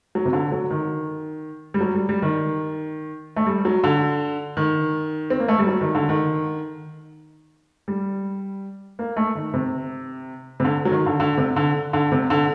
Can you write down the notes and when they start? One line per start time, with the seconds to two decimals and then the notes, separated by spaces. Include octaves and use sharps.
0.15 F#3
0.25 C3
0.33 D3
0.52 F#3
0.70 D#3
1.74 G3
1.81 F#3
1.95 G3
2.09 G3
2.22 D#3
3.36 A3
3.46 G3
3.65 F#3
3.84 D3
4.57 D#3
5.30 C4
5.39 A#3
5.48 A3
5.59 G3
5.67 F#3
5.81 D#3
5.95 D3
6.09 D#3
7.88 G3
8.99 A#3
9.17 A3
9.35 D#3
9.54 C3
10.60 C3
10.65 D3
10.85 F#3
10.91 D#3
11.06 D3
11.20 D3
11.37 C3
11.56 D3
11.93 D3
12.12 C3
12.30 D3